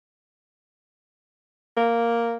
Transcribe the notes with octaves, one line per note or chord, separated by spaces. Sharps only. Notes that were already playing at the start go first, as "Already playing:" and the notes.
A#3